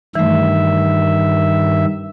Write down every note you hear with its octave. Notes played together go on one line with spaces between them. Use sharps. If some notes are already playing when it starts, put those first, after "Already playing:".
G2 D#3 E3 A3 E5